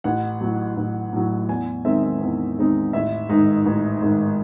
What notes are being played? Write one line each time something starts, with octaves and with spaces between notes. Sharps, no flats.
A1 F#5
A2 F#3
A1
A2 F#3
E2 G#5
D#3 G#3 C4 D#4 E5
E5
E2
D#3 G#3 C4 D#4
A1 E5
G#2 D#3 G#3 D#4
A1
G#2 D#3 G#3 D#4